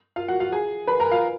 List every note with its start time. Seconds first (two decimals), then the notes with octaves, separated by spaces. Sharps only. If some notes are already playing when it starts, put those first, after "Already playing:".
0.16 F4 F5
0.28 F#4 F#5
0.40 F4 F5
0.52 G#4 G#5
0.87 B4 B5
1.00 A#4 A#5
1.11 F4 F5